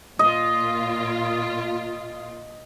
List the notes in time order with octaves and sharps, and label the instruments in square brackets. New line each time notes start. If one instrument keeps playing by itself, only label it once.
[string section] A#2 F4 [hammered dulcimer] D#5